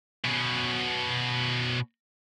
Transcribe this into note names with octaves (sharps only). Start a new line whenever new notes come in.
B2 C#4